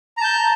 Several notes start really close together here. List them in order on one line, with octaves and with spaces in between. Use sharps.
A#5 A5 G6